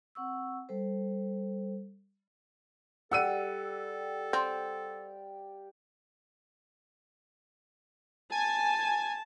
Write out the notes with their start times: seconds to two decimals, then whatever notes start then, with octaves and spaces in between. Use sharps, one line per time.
0.15 C4 F#5 C#6 E6
0.69 G3 A4 C5
3.11 G3 G4 A4 F#5 E6 D#7
4.33 C4 D5 F5 G5
8.32 G#5 A5